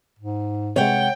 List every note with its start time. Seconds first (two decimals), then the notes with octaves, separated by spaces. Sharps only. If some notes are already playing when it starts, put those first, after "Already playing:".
0.19 G#2
0.76 C3 G#3 C#5 F#5 G5